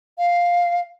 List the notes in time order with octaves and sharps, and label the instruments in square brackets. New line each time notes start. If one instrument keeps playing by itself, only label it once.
[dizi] F5